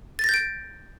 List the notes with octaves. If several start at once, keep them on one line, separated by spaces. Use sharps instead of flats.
G6 A6 A#6 D7